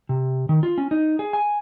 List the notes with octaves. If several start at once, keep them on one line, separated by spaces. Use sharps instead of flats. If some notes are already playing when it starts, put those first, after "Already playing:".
C3
D#3
F4
C#4
D#4
G#4
G#5